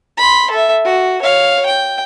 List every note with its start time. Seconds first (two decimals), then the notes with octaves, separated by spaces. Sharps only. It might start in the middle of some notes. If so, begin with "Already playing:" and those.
0.17 B5 C6
0.51 A4 E5
0.85 F#4
1.22 C#5 F5
1.66 G5